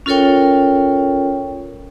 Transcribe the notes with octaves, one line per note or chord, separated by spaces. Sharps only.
C#4 F4 A4 A#4 C#5 G5